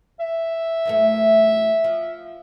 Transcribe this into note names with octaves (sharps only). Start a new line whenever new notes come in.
E5
F#2 E3 A3
F3